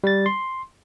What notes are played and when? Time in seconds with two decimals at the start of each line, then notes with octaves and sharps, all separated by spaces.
0.04 G3 A6
0.26 C6